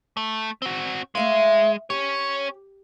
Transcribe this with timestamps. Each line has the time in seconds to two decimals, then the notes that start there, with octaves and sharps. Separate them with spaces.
0.17 A3
0.62 C4 F#4
1.15 G#3 A3 E5 F5
1.90 C#4 G4 C#5